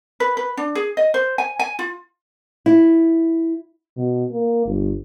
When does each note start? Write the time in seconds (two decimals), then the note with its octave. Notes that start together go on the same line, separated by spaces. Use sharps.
0.20 B4
0.37 B4
0.57 D4
0.75 G#4
0.97 D#5
1.14 C5
1.38 G#5
1.59 G#5
1.79 F4
2.66 E4
3.97 B2
4.31 A#3
4.66 G1